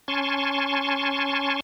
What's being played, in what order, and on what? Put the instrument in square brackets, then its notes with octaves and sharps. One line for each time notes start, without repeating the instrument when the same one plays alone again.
[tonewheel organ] C#4 G#5 A5 C6 C#6